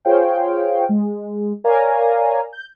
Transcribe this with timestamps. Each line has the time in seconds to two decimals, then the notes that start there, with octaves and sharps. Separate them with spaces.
0.05 F4 G#4 C5 C#5 F5 G5
0.89 G#3
1.64 A#4 C#5 D5 F5 G#5 A#5
2.53 G6